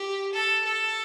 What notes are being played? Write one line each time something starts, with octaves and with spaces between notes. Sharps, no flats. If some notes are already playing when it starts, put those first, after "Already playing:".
Already playing: G4
A4
A4